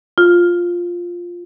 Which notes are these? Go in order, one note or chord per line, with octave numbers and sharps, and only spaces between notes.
F4